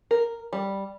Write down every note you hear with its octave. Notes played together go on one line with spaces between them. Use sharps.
A#4
G3